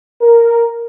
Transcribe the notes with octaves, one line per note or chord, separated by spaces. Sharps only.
A#4